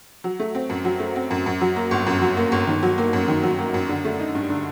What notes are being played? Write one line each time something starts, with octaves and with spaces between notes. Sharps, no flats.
F#3
A3
C4
F#2
F#3
A3
C4
F#2
F#2
F#3
A#3
G1
F#2
F#3
A#3
G1
D#3
F#3
A#3
F#2
D#3
F#3
A#3
F#2
D3
A3
D#4
G2
D3